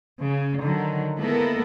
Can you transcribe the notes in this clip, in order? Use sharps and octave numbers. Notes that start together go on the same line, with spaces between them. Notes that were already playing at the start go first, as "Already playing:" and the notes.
C#3
D3 D#3 F#3
G#3 A#3 B3 E4 A4 A#4